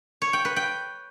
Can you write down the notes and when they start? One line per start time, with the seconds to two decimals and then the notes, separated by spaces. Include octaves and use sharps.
0.22 C#5
0.33 G5
0.45 B4
0.56 G5